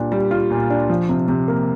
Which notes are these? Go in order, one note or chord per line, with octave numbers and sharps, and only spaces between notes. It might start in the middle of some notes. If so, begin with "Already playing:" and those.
Already playing: A#2 G3 D4
G3
F4
A#2
D4
F3
C3
C3
A#3